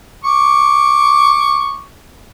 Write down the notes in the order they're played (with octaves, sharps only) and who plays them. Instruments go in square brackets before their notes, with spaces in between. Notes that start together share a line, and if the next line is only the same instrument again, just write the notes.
[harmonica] C#6 D6